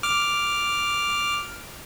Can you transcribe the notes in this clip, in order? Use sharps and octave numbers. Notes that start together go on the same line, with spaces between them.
D6 F6